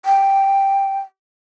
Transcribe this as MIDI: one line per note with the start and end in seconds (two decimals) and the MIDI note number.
0.05 0.98 79